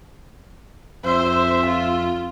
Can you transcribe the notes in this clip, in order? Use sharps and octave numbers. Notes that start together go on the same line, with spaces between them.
F2 C5 E5
F4